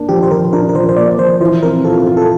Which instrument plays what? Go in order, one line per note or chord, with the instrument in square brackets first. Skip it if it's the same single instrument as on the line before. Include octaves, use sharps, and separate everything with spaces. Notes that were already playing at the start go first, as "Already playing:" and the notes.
Already playing: [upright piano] A#3 D4
[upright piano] F3 [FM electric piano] G4
[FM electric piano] C5
[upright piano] F3 [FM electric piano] A#4
[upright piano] D4 [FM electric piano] A#4
[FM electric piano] A#4
[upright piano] F3 [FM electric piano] C5
[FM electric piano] C5
[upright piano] A#3 [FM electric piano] D5
[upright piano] F3 [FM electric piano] C5
[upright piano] E3 [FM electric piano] C5
[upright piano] C4 [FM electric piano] A#4
[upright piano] F4 [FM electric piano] A4
[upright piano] F4
[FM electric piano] A4